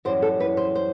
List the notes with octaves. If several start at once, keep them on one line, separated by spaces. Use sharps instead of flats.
F#2 E3 G3 C5
A4
B4
C5
C5